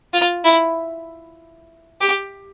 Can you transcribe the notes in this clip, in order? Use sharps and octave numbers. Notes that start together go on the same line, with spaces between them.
F4
E4
G4